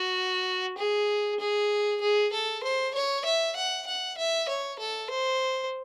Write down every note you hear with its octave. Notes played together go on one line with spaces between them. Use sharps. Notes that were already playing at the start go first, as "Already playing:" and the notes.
Already playing: F#4
G#4
G#4
G#4
A4
C5
C#5
E5
F#5
F#5
E5
C#5
A4
C5